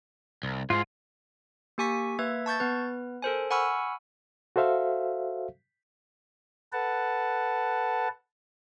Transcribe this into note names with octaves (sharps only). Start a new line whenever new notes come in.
C2
G#2 F4
A#3 G4 G#5 C#6 B6
A#3 B4 E5 G#6
A5 C#6 G6 A6
B3 B4
A4 A#4 C5 G#5
F#5 G#5 B5 C#6 E6 F6
F#4 A4 C5 E5 F5
A4 B4 F#5 A5